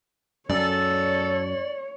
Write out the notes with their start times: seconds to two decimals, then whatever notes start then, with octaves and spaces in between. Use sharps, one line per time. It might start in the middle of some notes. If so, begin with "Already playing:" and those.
0.50 F#2 A4 C#5 D5